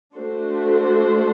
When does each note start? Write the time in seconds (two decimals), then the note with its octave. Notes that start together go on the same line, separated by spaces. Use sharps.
0.16 A3 D4 F#4 A4 C5